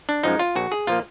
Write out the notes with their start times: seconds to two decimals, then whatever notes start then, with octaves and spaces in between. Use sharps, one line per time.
0.09 D4
0.23 F#2 F3 G#3 D#4
0.39 F4
0.56 A#1 F#4
0.72 G#4
0.87 A#2 F3 A#3 F4